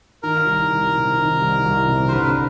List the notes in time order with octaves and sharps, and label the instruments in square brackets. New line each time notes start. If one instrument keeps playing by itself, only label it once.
[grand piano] D#3 [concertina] A#4
[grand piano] C2
C2
C3
D#3
C2
C2
C3
[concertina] C5
[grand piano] D3 [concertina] B4